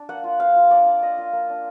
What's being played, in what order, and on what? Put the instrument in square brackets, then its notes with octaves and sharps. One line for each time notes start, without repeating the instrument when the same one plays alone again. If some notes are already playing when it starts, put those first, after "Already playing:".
Already playing: [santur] D4
A#3 F#5
F4
A#3 F5
F4
D4 D5
F4
A#3 D#5
F4
A#3
D4